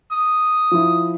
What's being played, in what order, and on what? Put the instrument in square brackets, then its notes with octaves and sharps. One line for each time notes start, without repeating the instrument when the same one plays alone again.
[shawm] D#6
[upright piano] F3 E4